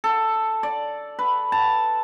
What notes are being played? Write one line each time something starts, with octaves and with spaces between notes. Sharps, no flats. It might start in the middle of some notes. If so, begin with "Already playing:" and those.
A4
D5
B4
A5